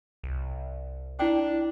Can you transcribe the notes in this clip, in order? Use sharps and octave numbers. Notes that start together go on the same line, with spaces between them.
C2
D4 E4 G5